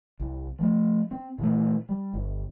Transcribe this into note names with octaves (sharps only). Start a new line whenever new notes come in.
C2
F3 G3 A3
C4
A#2 E3 A3
G3
G1